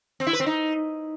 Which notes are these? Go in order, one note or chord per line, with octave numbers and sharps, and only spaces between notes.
C4
E4
B4
C4
D#4